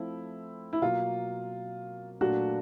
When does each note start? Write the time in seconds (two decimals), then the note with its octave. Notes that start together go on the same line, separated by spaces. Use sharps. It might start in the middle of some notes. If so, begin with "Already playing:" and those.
Already playing: F3 A3 C4 E4
0.73 E4
0.81 B2 F#3 A#3 F4
2.21 A#2 F#3 A3 D4 F4 F#4